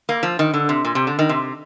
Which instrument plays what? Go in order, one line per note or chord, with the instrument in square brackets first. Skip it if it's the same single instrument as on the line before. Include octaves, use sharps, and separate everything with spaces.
[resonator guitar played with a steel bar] A#3
F3
D#3
D3
C3
A#2
C3
D3
D#3
C3